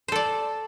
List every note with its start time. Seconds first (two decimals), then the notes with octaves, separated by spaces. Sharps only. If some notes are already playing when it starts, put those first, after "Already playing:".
0.08 C5
0.12 A4
0.16 D5